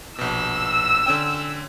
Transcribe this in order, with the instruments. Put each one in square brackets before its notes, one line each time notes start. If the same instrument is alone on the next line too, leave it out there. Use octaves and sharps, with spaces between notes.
[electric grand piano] A#1 B2 [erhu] E6
[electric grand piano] D3 C#4 G5